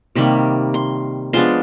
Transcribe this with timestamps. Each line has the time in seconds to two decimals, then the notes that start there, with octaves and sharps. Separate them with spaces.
0.15 C3 D#3 G3 A#3 B5
0.74 C6
1.33 F3 G#3 B3 D4 C6